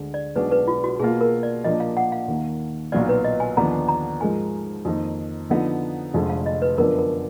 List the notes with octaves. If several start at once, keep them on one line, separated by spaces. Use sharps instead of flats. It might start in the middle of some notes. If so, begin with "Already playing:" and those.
Already playing: D2 D3 G#3
D5
B1 B2 G#3 D4 B4
B4
F4
F#4
B2 A#3 F4 G#4
A#4
D5
A#2 F3 A#3 D4 D#5
F5
F#5
F5
D#2 D#3 A#3
B1 A#2 F#3 B3 F4 D5
B4
D#5
G#5
D#2 D3 F3 B3 D4 A#5
A#5
G#2 F3 G#3 D#4 A#4 G#5
F2 D#3 A#3 D#4
D3 F3 B3 D#4
F1 F2 D3 G#3
F5
D#5
B4
F#2 D3 F3 B3 D4 A#4
A#4